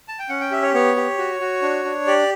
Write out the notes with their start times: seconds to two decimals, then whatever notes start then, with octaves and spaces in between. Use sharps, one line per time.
0.08 A5
0.19 G5
0.29 C#4 F#5
0.41 G5
0.51 G4 E5
0.62 C#5
0.73 B3 C#5
0.96 G4
1.18 F#4
1.40 F#4
1.62 D4
1.85 D4
2.07 G4 D5